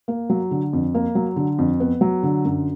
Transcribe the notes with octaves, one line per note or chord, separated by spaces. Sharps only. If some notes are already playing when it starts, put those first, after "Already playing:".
A#3
F#3
D3
F2
A#3
F#3
D3
F2
B3
F#3
D3
F#2